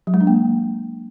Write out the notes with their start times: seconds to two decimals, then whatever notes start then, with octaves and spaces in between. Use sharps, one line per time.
0.07 F#3
0.14 G#3
0.20 D4
0.27 A#3